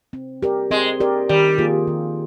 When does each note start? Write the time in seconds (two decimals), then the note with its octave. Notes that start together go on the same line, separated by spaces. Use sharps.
0.13 C4
0.43 G4 A#4 D5
0.71 G#3 C4
1.00 G4 A#4 D5
1.29 D#3 G3
1.58 A#3 F4 G#4
1.88 D#3